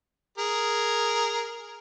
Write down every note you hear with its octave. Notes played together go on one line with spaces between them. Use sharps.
G#4 A#4